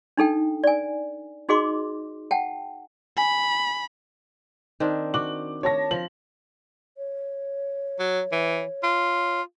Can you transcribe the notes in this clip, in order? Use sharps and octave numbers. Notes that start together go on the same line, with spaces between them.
D4 D#4 A4 G5
D5 G#5
D#4 F#4 G#4 D#5 C6 D6
F#5 G5 A5
G#5 B5
D#3 C4 D4
F#4 D6 F#7
C#5 A5 A#6
F3 F#7
C#5
F#3
E3
F4